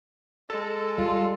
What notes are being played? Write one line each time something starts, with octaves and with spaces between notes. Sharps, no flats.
G#3 A4
G3 F4